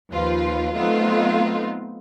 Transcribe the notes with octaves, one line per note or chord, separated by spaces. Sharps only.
D#2 F3 F4 B4
F#3 A3 B3 C4 D#4 F4